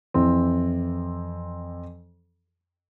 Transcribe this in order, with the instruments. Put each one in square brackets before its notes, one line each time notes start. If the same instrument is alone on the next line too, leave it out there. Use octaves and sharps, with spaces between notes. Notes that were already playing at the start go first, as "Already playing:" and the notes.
[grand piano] F2 E3 C4